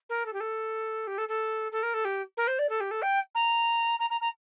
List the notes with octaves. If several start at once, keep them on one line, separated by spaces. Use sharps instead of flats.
A#4
A4
G4
A4
G4
A4
A4
A4
A#4
A4
G4
A#4
C5
D5
A4
G4
A4
G5
A#5
A#5
A#5
A#5